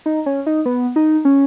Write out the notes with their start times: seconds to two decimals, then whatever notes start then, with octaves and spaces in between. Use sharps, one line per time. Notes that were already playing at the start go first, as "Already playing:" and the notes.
0.06 D#4
0.26 C#4
0.46 D#4
0.66 B3
0.96 D#4
1.25 C#4